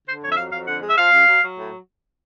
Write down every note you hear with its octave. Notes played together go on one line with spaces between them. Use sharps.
D3 C5
F2 C#5
E5
F#3 F5
F2 F5
D3 F#5
G#3
E5
F3 F5
D2
F#3
F#3
A2